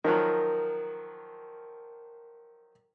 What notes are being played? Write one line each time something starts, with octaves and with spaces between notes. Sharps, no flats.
D#3 F3 F#3 A#4